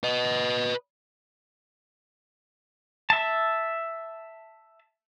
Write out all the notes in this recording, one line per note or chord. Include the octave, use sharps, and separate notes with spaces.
B4 D#5
E5 A5